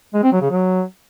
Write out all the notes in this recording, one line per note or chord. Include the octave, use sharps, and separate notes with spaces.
G#3
C4
F#3
C#3
F#3